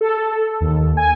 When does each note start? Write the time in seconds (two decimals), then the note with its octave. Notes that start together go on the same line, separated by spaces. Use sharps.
0.01 A4
0.61 D#2
0.97 G#5